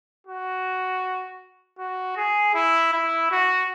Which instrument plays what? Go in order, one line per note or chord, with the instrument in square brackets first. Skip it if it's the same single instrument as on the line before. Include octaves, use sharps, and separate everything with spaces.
[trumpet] F#4
F#4
G#4
E4
E4
F#4